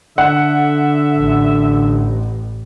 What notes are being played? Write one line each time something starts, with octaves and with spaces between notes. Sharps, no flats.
D3 E5 F#5
A1